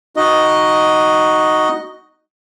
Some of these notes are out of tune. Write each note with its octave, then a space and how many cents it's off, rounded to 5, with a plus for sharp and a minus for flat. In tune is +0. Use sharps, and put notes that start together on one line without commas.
D#4 +0 F#4 +0 D#5 +0